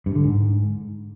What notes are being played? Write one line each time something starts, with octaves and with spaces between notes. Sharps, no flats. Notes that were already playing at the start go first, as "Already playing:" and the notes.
G2
D3
G#2